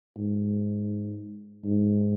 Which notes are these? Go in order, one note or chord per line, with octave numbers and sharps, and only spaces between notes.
G#2
G#2